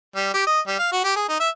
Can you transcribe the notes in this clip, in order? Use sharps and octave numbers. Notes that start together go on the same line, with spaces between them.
G3
G4
D#5
G3
F5
F#4
G4
G#4
D#4
E5